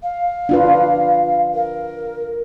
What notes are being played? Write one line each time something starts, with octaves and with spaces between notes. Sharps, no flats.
F5
D4 F4 B4
A#4